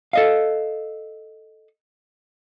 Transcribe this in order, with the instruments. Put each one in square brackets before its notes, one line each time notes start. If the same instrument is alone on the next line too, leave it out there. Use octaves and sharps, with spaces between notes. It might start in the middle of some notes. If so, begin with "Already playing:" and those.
[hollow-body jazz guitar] A4 D#5 F5